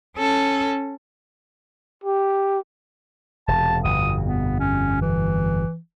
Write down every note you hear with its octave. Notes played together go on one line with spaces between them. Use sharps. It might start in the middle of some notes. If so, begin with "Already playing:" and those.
C#4 A4
G4
E1 C3 A5
G1 F2 B2 D#6
B3
C#4
E3